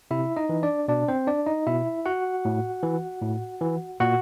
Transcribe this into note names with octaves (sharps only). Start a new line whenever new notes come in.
C3 E4 E5
D#4 D#5
E3
D4 D5
B2 D4 D5
C4 C5
D4 D5
D#4 D#5
B2 E4 E5
F#4 F#5
A2
E3
A2
E3
A#2 F#4 F#5